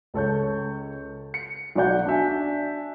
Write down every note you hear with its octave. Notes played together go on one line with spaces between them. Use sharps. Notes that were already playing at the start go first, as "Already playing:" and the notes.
C#2 A4 C#5 G6
C#7
B1 F#3 D5 F#5 G6
D4 F#4 E5 G#5